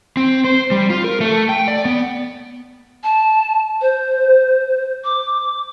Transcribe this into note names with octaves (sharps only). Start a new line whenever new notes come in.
C4
C5
G3
F4
A#4
A3
G5
D5
B3
A5
C5
D6